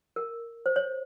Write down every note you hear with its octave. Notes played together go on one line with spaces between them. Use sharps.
A#4
C5
C#5